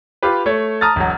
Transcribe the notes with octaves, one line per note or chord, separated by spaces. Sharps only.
F4 G4 B4
A3 C#5
A5 A#5 D#6 F6 A6
E1 F#3